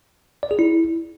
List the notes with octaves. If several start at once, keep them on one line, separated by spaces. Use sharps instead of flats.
D5
G#4
E4